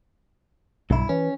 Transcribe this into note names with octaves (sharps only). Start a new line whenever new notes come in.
B1 G2 E4
E3 C#4